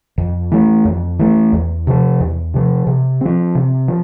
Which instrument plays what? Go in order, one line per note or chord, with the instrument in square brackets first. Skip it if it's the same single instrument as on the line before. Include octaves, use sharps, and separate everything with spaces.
[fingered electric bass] F2
E3 A3
F2
E3 A3
E2
C3 F3
E2
C3 F3
C3
F3 C4
C3
F3